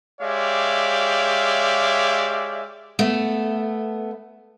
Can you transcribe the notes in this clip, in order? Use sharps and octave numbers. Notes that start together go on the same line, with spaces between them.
G#3 G4 C#5 D5 E5 F5
A3 B3